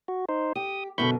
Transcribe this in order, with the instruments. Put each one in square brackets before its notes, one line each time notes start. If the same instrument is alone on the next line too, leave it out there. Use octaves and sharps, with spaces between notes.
[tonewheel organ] F#4
D#4 C5
[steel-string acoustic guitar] G4 [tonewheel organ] D#6
[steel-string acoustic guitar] F#2 B2 D3 [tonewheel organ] B5 C#6 G6